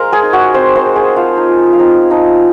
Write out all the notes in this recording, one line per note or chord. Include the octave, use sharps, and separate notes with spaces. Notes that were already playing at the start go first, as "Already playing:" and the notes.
Already playing: G#3 A#3 A#4 C5 A#5 C6
G#4 G#5
D#4
F#4 F#5
C4 C5 C6
C5 C6
G#3
G#4 G#5
F3 F4 F5
D#4 D#5
F4
F5
C4 D#4 D#5
F3 D#4 D#5